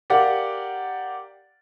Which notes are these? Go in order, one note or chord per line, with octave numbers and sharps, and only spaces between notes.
G4 A#4 D5 F5 F#5